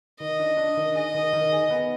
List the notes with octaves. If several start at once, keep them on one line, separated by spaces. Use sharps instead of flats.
D#3 D#5
D4
D4
D#3
G#4 D#5
D#3
D#3
G#4
B3